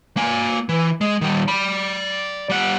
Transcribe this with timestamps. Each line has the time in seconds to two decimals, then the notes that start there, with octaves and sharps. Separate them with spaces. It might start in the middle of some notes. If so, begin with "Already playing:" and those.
0.17 A#3 G#5
0.69 E3
1.01 G#3
1.21 D#3 G3
1.48 D5 B5
2.50 G3 F#5